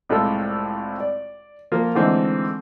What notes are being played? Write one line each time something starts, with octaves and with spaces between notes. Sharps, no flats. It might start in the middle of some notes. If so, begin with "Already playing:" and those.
C2 A2 G#3 F4 A4
D5
F3 A#3 F4
D3 E3 G#3 A3 C4 D#4